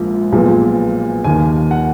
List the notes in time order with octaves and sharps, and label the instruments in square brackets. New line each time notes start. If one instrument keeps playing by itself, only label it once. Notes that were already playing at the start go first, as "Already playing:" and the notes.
Already playing: [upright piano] A#1 G#2 F3 A#3
B1 A#2 F3 G#3 B3
D#2 D#3 A#3 G#5
F#5